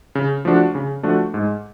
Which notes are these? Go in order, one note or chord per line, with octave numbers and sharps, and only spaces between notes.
C#3
F3 A3 D4 F#4
C#3
F3 A3 D4 F#4
G#2